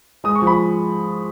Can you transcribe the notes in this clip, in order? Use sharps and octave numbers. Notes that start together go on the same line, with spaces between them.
G#3 D#6
C#6
F3
B5